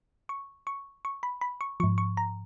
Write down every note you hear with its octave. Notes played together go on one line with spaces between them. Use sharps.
C#6
C#6
C#6
B5
B5
C#6
G#2 F3 C#6
C#6
A#5